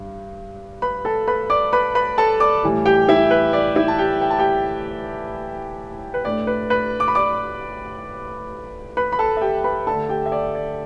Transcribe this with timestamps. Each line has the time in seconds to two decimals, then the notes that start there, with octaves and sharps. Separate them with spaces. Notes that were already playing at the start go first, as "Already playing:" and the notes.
Already playing: G2 D4
0.82 B4 B5
1.05 A4 A5
1.28 B4 B5
1.50 D5 D6
1.73 B4 B5
1.95 B4 B5
2.18 A4 A5
2.40 D5 D6
2.63 A2 E3 G3
2.85 G4 G5
3.09 E4 E5
3.31 B4
3.53 D5
3.76 E4 E5
3.88 A5
3.98 G4 G5
4.21 G5
4.30 A5
4.39 G4 G5
6.14 B4
6.25 A2 A3 D4 D5
6.47 B4
6.70 B4 B5
7.00 D6
7.08 B5
7.15 D5 D6
8.97 B4 B5
9.12 B5
9.19 A4 A5
9.37 E5
9.41 G4 G5
9.64 B4 B5
9.87 D3 A3 D4 A4 A5
10.09 G4 G5
10.26 E5
10.32 D5
10.55 D5